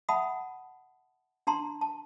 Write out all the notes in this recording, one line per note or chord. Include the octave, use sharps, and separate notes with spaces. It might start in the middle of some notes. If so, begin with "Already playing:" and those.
E5 F#5 A5 B5 D#6
D4 A5 A#5 C6
A5